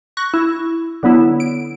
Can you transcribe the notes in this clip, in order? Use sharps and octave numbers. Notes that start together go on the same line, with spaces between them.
C#6 F#6 A#6
E4
D3 F#3 B3 E4
D7